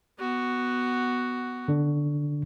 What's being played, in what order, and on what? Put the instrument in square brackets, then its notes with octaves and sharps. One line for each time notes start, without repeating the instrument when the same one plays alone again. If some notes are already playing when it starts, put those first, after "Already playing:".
[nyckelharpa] B3 F#4
[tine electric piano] D3 D4